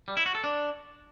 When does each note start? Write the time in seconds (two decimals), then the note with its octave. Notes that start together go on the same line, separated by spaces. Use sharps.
0.08 G3
0.17 E4
0.26 F#4
0.35 A4
0.44 D4